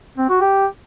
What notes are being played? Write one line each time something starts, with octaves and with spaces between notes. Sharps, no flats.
C4
F#4
G4